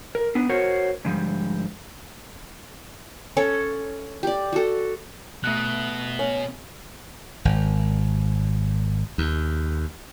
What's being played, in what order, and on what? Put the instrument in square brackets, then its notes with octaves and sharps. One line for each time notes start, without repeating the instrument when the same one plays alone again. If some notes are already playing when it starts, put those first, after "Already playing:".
[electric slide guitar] A#4
B3 D4
F#4 A#4 C5 C#5 F#5
G#2 D3 F3 G3
[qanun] C#4 A4 C#5
G4 D5
F#4 A4
[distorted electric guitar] B2 [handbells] A3 F#6
[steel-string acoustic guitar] C#4
[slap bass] G#1
D#2